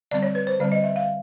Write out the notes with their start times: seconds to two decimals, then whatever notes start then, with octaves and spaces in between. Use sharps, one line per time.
0.11 D3 G3 C4 D5
0.22 C#5
0.35 B4
0.47 C5
0.60 D3 G3 C4 D5
0.72 D#5
0.84 E5
0.96 F5